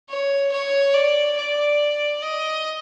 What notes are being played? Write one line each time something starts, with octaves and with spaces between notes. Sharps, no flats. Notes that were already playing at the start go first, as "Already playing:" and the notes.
C#5
C#5
D5
D5
D#5